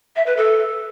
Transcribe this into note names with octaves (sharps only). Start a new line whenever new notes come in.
E5
B4
A4